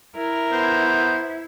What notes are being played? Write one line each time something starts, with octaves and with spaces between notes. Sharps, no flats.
E4 A#4
B3 C5